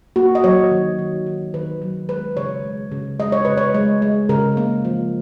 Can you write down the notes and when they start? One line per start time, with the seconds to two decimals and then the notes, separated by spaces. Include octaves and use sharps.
0.16 A#3 F#4
0.35 D#5
0.44 F#3 C#5
0.71 D#3
0.99 D#3
1.26 D#3
1.54 D#3 B4
1.82 F#3
2.09 G#3 B4
2.37 C#3 C#5
2.64 G#3
2.92 C#3
3.20 G#3 D#5
3.32 C#5
3.45 C#3 B4
3.57 C#5
3.74 G#3
4.02 G#3
4.29 C#3 A#4
4.57 A#3
4.85 F3